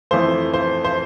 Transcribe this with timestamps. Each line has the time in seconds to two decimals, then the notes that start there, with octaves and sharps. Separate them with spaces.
0.11 F2 E3 A3 C5
0.54 C5
0.85 C5